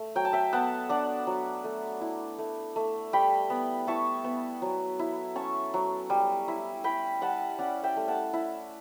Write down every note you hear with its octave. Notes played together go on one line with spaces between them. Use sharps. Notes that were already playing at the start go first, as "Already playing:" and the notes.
Already playing: A3
F#3 G5
A5
E5 G5
B3 F#5 A5
D4 D5 F#5
F#3
A3
E4
A3
A3
G3 G5 B5
B3
E4 A5 C#6
B3
F#3
E4
C#4 A5 C#6
F#3
G3
E4
E4 G5 B5
G3 F#5 A5
C#4 D5 F#5
E5 G5
A3
F#5 A5
E4